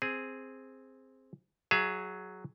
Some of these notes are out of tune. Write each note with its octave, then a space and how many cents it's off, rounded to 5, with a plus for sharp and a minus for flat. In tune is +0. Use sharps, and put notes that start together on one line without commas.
C4 +0 G#4 +0
F#3 +0 G#4 +10 E5 +45